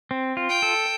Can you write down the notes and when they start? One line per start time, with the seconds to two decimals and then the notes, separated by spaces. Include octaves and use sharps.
0.11 C4
0.37 F4
0.49 G5
0.62 A4